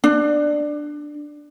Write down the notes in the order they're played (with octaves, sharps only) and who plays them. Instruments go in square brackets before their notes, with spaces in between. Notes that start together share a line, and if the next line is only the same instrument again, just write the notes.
[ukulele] D4